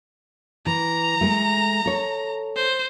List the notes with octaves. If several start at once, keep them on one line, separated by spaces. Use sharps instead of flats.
E3 A#5
G#3 A3
A4 C#5
C5